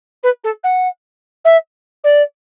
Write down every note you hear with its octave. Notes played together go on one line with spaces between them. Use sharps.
B4
A4
F#5
E5
D5